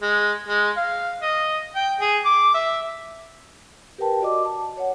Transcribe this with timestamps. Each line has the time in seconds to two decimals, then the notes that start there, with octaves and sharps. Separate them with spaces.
0.02 G#3
0.48 G#3
0.77 F5
1.22 D#5
1.76 G5
2.01 G#4
2.25 D6
2.54 E5
3.98 G4 A#4 B4 G5 A5
4.21 F#4 D5 D#5 D6
4.45 A5
4.77 C#5 F#5